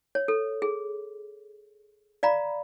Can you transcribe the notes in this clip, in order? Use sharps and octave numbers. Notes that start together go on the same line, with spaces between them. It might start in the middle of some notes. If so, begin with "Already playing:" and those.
C#5
A4
G#4
D5 F5 A#5 B5